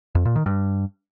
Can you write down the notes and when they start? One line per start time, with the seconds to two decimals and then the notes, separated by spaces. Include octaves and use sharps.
0.15 F2
0.25 A#2
0.36 D#3
0.46 G2